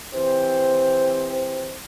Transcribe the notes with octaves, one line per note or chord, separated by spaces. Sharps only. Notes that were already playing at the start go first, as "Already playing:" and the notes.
E3 C4 G4 C5